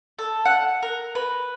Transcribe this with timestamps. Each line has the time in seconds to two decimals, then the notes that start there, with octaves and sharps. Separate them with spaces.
0.19 A4
0.45 F#5
0.83 A#4
1.15 B4